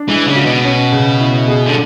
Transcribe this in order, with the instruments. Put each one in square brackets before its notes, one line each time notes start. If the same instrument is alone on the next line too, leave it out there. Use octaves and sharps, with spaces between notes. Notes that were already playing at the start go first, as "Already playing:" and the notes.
Already playing: [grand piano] D4
[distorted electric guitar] E3 [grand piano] G#3
[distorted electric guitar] C#3
[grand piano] F#4
[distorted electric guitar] B2
[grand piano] C#4
C#3
E4
G#4
[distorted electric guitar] D3